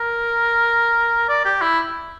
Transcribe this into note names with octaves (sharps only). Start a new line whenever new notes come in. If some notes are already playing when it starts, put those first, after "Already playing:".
Already playing: A#4
D5
G4
E4